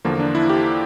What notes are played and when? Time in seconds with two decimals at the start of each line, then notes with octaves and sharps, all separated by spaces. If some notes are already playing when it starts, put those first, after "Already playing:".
0.05 E2 D3 F3 A#3
0.20 D4
0.35 E4
0.49 G4